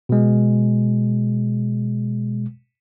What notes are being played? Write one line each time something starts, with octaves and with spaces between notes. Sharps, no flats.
B2 G#3